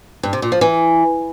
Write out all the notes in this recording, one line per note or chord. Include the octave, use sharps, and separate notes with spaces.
G2
C3
A#2
F3
E3